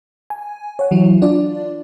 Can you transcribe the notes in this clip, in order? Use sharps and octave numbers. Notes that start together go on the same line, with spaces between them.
G#5
C#5 F#5
E3 F#3 E4
D4 F4 D5